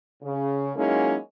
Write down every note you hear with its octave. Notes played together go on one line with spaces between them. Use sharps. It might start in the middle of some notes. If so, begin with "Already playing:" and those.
C#3
F#3 G#3 A#3 C#4 D#4 E4